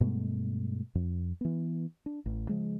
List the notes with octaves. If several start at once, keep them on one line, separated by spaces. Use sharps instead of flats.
G2 B2 G#3 A3
F2
E3 B3
D4
A1
C#3 F3 G#3